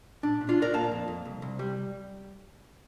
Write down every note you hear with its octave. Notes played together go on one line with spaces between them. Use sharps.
A#2 D4
A#2
D4 F4
A#2 A#4 D5
A#3 F5 A5
F2
F2
C2
C2
G3